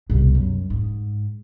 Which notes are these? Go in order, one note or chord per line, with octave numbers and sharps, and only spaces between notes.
C2 B2
F#2
G#2